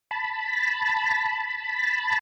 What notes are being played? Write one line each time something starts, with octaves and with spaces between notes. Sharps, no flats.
A5 B5